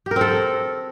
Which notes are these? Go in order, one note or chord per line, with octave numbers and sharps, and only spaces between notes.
C4 G4 A4 A#4